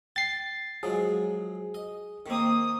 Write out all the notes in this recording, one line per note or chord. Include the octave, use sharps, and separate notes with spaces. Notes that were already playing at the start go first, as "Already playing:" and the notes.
G5 A6 C7
F3 F#3 G#3 G#4
D#5
D#3 A#3 C4 D#6